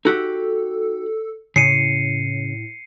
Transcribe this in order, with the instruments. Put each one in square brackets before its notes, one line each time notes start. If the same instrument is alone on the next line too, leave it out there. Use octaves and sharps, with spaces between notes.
[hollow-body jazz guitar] D#4 F#4 G4 [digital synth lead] A4
[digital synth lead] A2 [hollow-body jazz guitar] C#3 [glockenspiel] C7 C#7 D#7